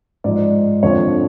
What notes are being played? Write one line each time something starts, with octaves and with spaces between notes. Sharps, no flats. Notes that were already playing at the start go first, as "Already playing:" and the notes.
G#2 F3 D5
F2 D3 F3 C#5